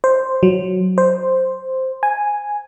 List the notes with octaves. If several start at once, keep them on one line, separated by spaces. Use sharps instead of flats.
C5
F#3
C5
G#5